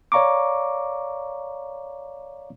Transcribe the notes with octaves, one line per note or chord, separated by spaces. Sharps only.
C#5 D5 F5 A#5 C#6 D6